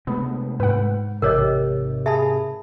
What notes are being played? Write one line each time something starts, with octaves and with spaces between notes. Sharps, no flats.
C3 G#3 A3 B3
G#2 B4 F#5
A1 C3 G4 A#4 C#5 D#5
G#4 E5 A5 B5